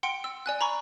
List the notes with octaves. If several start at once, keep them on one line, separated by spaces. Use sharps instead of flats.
F#5 G5 C6 C#7 D7
E6
D5 G#5 F#6
A#5 B5 C#6